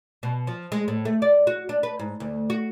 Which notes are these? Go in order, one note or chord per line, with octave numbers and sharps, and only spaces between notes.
B2
F3
G#3
A2
A3
D5
F#4
D4
B4
G#2
D2
F#4